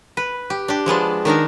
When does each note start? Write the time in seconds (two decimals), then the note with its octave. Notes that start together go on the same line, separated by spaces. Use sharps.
0.17 B4
0.50 G4
0.68 D4 G4
0.86 F3 G#3 B3 D4
1.25 D#3 D4 D#4 A#4